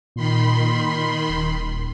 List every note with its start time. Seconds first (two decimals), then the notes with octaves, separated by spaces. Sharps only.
0.16 A#2 D#3 B5 C6
1.29 D#1